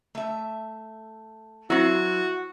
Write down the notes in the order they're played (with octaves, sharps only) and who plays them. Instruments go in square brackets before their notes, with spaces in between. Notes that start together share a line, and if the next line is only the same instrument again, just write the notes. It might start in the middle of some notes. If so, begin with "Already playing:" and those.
[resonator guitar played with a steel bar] A3 E5
[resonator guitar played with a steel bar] F#3 C4 [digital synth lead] E4 [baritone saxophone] F#4